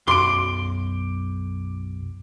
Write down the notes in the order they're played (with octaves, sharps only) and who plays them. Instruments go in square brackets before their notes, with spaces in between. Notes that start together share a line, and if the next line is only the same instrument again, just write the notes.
[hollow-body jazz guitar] B1 F#2 C6 [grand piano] D6 D7